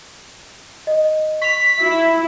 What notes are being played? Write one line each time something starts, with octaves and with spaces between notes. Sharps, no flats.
D#5
C#6 B6 F7
E4